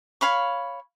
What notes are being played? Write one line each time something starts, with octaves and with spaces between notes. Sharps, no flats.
C#5 F5 B5 C#6